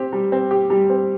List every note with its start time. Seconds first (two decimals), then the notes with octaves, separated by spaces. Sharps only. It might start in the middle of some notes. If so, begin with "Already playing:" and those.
Already playing: C4 G4
0.13 G3
0.32 C4
0.51 G4
0.70 G3
0.90 C4